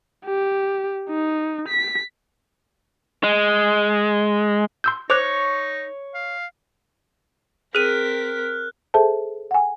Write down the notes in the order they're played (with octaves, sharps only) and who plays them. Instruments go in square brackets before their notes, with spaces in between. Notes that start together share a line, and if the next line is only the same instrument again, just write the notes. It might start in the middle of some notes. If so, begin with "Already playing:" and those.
[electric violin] G4
D#4
B6
[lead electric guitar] G#3
[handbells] C6 E6 G6
[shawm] D#4 [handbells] C5 D6 F#6 [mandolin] C#5
[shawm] F5
[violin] C4 B6 [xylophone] G#4 D#7 [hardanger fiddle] A#4 [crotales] F6 F#6
[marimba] G#4 A4 C5 E5 A5
F#5 G#5